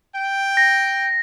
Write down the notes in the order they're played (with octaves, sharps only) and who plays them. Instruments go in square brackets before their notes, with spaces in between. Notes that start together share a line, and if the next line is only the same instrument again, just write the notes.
[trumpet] G5
[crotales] A#6